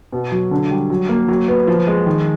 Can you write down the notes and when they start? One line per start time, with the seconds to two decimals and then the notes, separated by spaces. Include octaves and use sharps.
0.12 B2
0.32 F#3
0.51 D3
0.71 G3
0.90 F#3
1.09 A#3
1.28 F#3
1.48 B3
1.67 F3
1.87 G#3
2.06 D#3